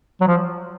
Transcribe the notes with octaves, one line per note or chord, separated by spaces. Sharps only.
F#3
F3